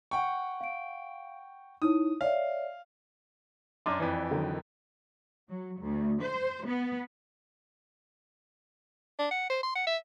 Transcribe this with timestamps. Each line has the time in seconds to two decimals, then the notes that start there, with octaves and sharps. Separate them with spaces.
0.11 F#5 G5 C#6
0.60 F5 D7
1.82 D#4 E4 C#5 D#6
2.21 C#5 D5 E5 F5
3.86 F#2 D4 C6 D6
3.99 F2 E3 B4 D5 G#5
4.31 D3 D#3 F#3
5.49 F#3
5.80 D2
6.22 C5
6.66 B3
9.19 D4
9.31 F#5
9.50 C5
9.63 C6
9.75 F#5
9.87 E5